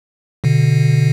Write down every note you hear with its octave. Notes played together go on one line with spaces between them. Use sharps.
B2 D3